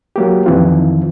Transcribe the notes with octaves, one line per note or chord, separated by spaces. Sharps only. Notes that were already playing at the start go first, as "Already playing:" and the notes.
F#3 A#3 G4
F2 D#3 E3 C4 F4